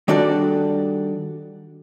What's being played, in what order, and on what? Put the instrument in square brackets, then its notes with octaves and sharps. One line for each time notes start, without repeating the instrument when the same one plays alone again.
[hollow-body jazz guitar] D#3 G3 D4 F#4 A4 D5